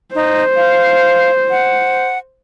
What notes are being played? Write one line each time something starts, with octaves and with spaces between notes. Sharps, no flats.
D#4 C5
F5
F#5